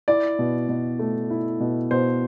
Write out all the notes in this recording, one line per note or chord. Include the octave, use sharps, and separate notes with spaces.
E4 D5
B2
B2
A3
E4
B2
B2 C5